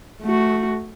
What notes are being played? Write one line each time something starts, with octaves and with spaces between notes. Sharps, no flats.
A3 F#4